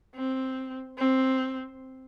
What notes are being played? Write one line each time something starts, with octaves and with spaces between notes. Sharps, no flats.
C4
C4